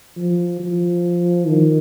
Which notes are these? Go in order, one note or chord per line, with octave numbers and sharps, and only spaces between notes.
F3
F3
D#3